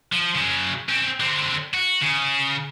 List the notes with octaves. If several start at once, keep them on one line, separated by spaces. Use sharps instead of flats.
F3
C#3 F#3
C4 C#4
D3 C4
F#4
C#3